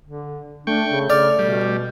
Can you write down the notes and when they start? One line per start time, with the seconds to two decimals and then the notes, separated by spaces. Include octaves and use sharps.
0.05 D3
0.67 A3 D4 G5 C#6
0.90 C#3
1.10 C#3 D5 F6
1.39 B2 G3